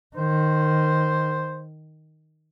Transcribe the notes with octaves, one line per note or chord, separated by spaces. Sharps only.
D#3 C5